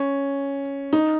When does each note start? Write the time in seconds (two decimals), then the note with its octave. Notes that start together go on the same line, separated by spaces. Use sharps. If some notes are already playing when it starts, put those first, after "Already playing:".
Already playing: C#4
0.93 D#4